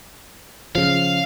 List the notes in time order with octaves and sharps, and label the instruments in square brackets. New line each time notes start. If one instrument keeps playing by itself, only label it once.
[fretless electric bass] C#3 F3 [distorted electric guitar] F5